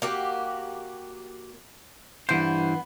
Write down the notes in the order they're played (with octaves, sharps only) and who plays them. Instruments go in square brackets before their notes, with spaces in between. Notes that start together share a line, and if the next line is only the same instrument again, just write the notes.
[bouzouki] A#3 F#4 G4
[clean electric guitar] G2 E3 C5 [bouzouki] B3